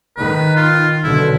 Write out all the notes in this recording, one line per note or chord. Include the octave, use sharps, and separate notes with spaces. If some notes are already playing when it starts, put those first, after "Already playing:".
D#3 B4
F4
B1 B2 D3 E4